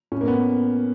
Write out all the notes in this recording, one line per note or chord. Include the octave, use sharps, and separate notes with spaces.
A2 C#4
A#3
B3